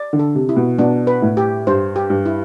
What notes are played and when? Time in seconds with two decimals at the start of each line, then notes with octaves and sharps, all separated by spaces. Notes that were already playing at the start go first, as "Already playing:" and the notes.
Already playing: D5
0.13 D3
0.19 A4
0.35 C3
0.49 E4
0.56 B2
0.79 B2 D4
1.07 B4
1.22 A2
1.37 G4
1.67 G2 C5
1.96 G4
2.10 G2
2.26 E4